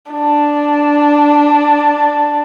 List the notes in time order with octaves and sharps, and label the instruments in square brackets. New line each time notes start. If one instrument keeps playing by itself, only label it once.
[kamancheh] D4